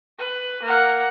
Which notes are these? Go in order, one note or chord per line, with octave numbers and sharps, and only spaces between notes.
B4
A#3 F#5